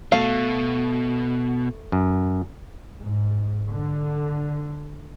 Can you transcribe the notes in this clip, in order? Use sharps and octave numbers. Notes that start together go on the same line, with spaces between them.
B2 A3 F5
F#2
G#2
D3